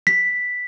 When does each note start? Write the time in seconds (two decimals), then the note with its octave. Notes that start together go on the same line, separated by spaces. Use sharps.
0.07 B6